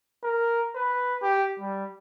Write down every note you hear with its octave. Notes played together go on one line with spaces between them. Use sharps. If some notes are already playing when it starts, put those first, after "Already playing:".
A#4
B4
G4
G3